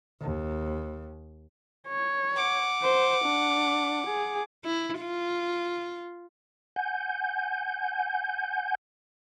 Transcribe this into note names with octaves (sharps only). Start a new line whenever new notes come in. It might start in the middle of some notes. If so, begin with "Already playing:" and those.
D#2
C#5
F#5 D6
C5
D4
G#4
E4
F4
F#5 G#5 G6